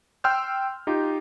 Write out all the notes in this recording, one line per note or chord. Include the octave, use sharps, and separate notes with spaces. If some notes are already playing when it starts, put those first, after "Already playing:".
G5 C6 E6 F6 G6
D#4 F4 G4